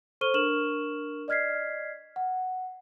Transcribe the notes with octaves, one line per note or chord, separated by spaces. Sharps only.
A4 C5 C#6 F6 D#7 G7
D4 A#4 C#6 F6 E7 F#7
D5 D#5 F6 G#6 B6 C7
F#5